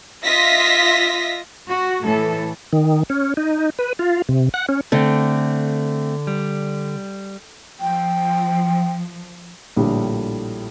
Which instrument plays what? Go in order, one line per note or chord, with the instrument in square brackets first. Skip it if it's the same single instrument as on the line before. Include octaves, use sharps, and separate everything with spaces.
[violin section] F4 D#5 E5 A#6 B6
[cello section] F#4
A2 E3 A4
[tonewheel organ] D#3
C#4
D#4
B4
F4
C3
F#5
C#4
[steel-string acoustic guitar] D3 [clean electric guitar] A3 C4
[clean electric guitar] G3
[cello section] F3 [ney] G5
[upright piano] A#1 A2 D3 G3